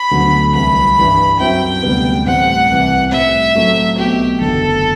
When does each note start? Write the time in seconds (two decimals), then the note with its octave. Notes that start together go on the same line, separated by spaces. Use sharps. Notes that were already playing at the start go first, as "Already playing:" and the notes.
Already playing: B5
0.11 D2 D3 F#3 B3
0.54 C2 C3 E3 B5
0.98 G2 E3 G3
1.40 F#2 F#3 C4 E4 G5
1.83 D2 C3 G3 B3
2.26 A2 E3 G3 C4 F#5
2.70 C2 C3 E3
3.12 A2 G3 C4 E5
3.55 A2 F#3 A3 C4 F#4
3.98 B1 B2 A3 C4 F#4 G4
4.41 F#1 E2 D3 F#3 A3 A4